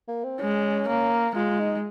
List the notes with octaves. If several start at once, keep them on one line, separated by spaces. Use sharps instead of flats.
A#3
C4
G#3 C#4
A#3
G#3 F4
D#4